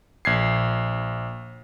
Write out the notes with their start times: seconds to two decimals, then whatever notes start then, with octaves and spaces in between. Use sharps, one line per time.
0.25 A#1 G#6 C7